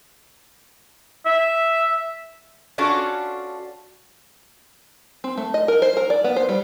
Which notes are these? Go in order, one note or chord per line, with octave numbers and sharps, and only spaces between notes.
E5
C#4 D4 F4 F#4 A4
C4
A3
D#5
A#4
C5
A#4
D5
B3
C5
G3